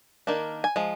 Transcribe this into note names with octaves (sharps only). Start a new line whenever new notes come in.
D#3 A#3 D4
G#5
F3 G#3